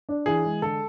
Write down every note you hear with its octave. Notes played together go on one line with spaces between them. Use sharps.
D4
E3 G#4
G#3
D3 A4